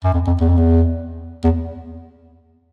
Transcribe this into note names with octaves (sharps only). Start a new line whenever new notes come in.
F#2
F2
F2
E2
F2
E2
E2